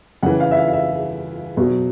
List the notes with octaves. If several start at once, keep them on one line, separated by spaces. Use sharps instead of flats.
C#3 E3 F#5
F5
E5
F5
F5
E5
B2 F#3